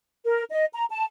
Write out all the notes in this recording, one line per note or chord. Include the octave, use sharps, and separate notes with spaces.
A#4
D#5
A#5
A5